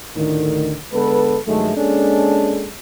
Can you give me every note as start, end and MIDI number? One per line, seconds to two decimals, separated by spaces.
0.16 0.76 38
0.16 0.76 45
0.16 0.76 50
0.16 0.76 51
0.93 1.38 50
0.93 1.38 56
0.93 1.38 59
0.93 1.38 69
0.93 1.38 71
1.47 1.76 43
1.47 1.76 51
1.47 1.76 54
1.47 1.76 56
1.47 1.76 57
1.76 2.70 56
1.76 2.70 58
1.76 2.70 61
1.76 2.70 62
1.76 2.70 68
1.76 2.70 69